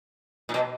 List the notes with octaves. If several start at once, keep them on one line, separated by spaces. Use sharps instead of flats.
A#2
B2